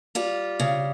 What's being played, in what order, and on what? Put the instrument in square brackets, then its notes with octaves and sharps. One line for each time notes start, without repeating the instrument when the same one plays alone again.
[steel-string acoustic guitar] G3 F4
C#3